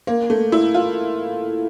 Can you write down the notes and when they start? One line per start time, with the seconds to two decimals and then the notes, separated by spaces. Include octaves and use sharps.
0.07 A#3
0.30 A3
0.52 E4
0.74 F4